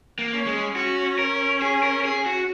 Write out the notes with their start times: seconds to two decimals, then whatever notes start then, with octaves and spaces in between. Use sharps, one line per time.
0.19 A#3
0.33 C#4
0.46 G#3
0.76 C#4 F#4
1.19 A#4
1.62 G#4
1.83 A#4
2.05 G#4
2.26 F#4